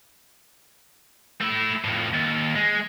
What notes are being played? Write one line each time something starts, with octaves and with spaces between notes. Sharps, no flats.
A3 E4
F2 A2
D#2
G#3